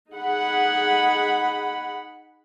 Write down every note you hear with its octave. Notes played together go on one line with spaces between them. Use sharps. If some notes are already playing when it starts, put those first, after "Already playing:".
D#4 G#4 F#5 B5